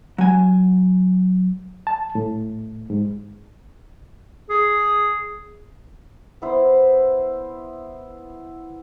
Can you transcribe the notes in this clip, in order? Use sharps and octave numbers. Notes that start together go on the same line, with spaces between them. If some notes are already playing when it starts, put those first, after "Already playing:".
F#3 G#5
A5
A2
G#2
G#4
B3 E4 C5